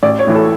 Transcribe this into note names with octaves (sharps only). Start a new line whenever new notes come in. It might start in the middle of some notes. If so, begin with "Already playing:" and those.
A1 D5
C#5
A2 E3
A4